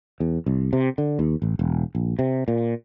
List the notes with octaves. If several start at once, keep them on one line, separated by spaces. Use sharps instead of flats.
E2
C2
C3
D3
D#2
A1
E1
A#1
C3
A#2